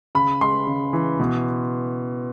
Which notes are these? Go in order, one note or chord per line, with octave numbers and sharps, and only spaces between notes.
C#3 B5
G#3 C6
C#3
E3
B2